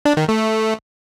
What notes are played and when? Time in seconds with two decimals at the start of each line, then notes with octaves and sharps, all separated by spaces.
0.05 D4
0.17 D#3
0.28 A3